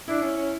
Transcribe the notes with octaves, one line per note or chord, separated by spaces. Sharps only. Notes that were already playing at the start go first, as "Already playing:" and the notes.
D4 E4
C#4
C#4